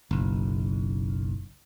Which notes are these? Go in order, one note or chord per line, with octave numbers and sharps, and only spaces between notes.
F#1 B1